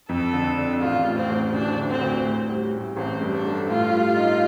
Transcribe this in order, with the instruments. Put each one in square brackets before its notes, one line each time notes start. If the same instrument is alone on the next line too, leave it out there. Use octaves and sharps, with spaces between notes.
[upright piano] F2 [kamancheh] A4
[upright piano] D3
D4
[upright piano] A1 [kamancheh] F4
[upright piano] A2
[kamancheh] C4
[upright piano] A1
[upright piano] D2 [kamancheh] D4
[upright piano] D3
[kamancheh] C4
[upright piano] D2
A2
G3
A2
[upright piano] A1 [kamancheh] C4
[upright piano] G2
[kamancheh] D4
[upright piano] A3
[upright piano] A2 [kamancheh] F4
[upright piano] G3
D#4